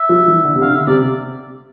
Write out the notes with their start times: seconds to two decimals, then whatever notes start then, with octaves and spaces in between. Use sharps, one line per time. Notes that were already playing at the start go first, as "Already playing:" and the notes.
Already playing: E5
0.09 F3
0.27 E3
0.45 D3
0.55 C3
0.61 D3 F5
0.75 E5
0.88 C3 D5